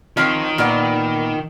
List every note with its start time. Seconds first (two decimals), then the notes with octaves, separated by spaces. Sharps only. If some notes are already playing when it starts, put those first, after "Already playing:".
0.17 D#3 F3 C4 C#5
0.58 A#2 B3 D5